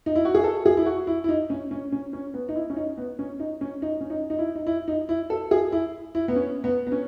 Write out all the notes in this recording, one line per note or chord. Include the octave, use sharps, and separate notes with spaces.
D#4
E4
F#4
G#4
A4
G#4
E4
F#4
E4
E4
D#4
C#4
C#4
C#4
C#4
B3
D#4
E4
C#4
D#4
B3
C#4
D#4
C#4
D#4
C#4
D#4
D#4
E4
D#4
E4
D#4
E4
A4
G#4
E4
E4
B3
C#4
B3
B3
C#4